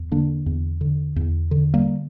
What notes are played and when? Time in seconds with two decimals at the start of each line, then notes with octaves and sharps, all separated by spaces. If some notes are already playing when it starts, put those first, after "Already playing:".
Already playing: E2
0.12 D3 A#3 D4
0.46 E2
0.81 D3
1.16 E2
1.51 D3
1.74 G3 A#3